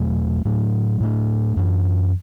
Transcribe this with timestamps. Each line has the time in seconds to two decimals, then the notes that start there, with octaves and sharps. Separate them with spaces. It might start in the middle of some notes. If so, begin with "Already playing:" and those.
Already playing: E2 B2 F#3 A3
0.45 A2 F#3 A3 D4
1.00 A2 A3 D4
1.57 F#2 E3 D4